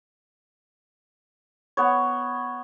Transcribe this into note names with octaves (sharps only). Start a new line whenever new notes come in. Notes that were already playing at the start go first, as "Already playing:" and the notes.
B3 C#5